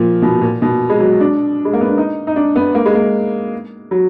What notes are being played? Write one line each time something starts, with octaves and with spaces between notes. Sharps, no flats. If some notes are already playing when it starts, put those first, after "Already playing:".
Already playing: A#2 F3
B2
A#2
B2
G#3
F#3
D4
G#3
A#3
B3
D4
D#4
D#4
D4
B3
A#3
G#3
A#3
F#3